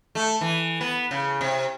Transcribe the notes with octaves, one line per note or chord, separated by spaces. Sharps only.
A3
E3
B3
C#3
C3